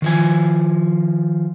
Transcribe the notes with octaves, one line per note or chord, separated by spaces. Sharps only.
D#3 F3 G#5